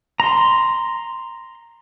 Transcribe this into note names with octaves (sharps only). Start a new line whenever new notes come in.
A#5 C6